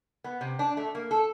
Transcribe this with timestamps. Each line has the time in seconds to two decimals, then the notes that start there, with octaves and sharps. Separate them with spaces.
0.24 B3
0.41 C3
0.59 D4
0.77 A3
0.95 A#3
1.11 A4